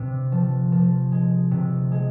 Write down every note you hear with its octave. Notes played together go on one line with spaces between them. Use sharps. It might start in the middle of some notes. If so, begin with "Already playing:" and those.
Already playing: C3
F3
F3
G#3
C3
G#3